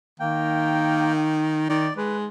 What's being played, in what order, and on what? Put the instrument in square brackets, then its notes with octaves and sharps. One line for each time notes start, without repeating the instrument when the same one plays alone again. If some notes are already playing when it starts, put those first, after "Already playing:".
[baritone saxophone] D#3 [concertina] A#3 G5
[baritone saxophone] D#3 [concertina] D5
[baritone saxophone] G#3 [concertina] B4